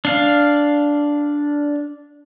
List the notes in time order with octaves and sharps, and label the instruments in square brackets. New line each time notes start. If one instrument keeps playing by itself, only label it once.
[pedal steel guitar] D4 F5